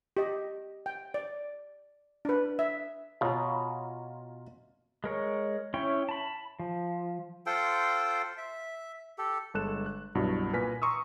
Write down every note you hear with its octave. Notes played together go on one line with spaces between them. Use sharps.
G4 D#5
G5
D5
D4 B4
E5
B2 F4 C#5 A#5
G#3 A#4 C#5
C#4 E4 C#5 G5
A5 B5
F3
F4 A4 C5 G5
E5
G4 A4
G1 G#3 A4 F#6 E7
F#6
C2 G2 B2 F#3 E4
A#2 B4 G#5 F6 A#6 B6
A#5 C6 C#6 D#6 E6